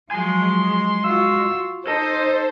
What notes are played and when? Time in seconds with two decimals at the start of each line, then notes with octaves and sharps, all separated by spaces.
0.11 F3 F#3 G#3 G#5 C6
1.04 F4 F#4 E6
1.87 D#4 A4 C5 D#5 A5